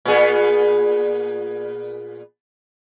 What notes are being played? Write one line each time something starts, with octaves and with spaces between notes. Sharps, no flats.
A#2 B3 G#4